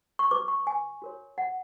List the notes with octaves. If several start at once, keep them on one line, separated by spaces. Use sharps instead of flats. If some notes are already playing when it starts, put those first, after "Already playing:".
C#6
F#4 B4 D6
C#6
G#5
F#4 A#4 C#5
F#5